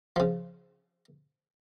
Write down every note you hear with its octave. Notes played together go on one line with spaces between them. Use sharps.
C#3 F3